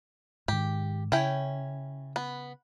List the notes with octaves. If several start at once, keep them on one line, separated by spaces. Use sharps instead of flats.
G#2 D#3 G4
C#3 C#4 E4 G5
B3